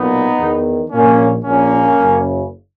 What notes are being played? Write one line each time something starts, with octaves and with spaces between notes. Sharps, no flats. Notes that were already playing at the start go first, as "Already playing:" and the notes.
Already playing: B1 A#2 B3 D#4
E2 D#3
A#1 A#2 A#3 C#4
A#1 A#2 A#3 C#4
F#1 F#2 C#3